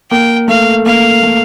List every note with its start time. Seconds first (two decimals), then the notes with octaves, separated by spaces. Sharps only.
0.11 A#3 G5
0.48 A3 F5
0.86 A#3 F5
1.23 A3